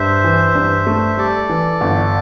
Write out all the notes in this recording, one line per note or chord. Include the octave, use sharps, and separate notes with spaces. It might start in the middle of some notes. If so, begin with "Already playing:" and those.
Already playing: G2 C5 E5
E3
G2
A3
G3 A4 D5
E3
G1